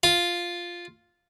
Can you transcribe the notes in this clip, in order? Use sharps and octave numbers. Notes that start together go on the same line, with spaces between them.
F4